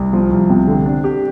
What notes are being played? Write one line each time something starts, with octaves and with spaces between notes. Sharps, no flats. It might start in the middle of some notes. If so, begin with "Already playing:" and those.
Already playing: C2
F3
C2
C3
D3
D4
G4